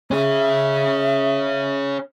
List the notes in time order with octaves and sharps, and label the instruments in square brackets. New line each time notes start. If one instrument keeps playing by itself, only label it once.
[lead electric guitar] C#4 G#4 [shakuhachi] E5